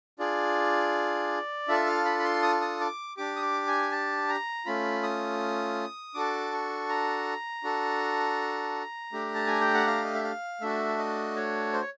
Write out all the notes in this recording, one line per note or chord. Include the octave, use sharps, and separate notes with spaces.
D4 F4 G#4 D5
D4 F4 A4 E5
F5
B5
B5
C6
D#6
D#6
D6
D4 G4 D6
D#6
D6
G#5
A5
A#5
A3 C#4 F4 B5
D#6
D4 F#4 A4 D6
C#6
A#5
D4 F#4 A4
A3 D4 G4
A5
G#5
G5
F#5
F5
D#5
E5
F5
A3 D4 F#4 E5
D#5
C#5
C5
C#5